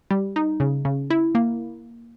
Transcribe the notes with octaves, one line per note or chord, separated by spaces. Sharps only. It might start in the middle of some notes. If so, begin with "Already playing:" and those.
G3
D#4
C#3
C#3
E4
A#3